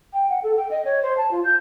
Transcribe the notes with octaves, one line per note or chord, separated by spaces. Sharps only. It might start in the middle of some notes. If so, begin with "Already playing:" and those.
G5
F#5
A4
G5
D#5
C#5
C5
A5
F4
G6